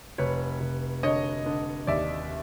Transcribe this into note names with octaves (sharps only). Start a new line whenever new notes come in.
F1 B4 C#5
F1
D3 C#5 D#5
D3
D#2 D5 E5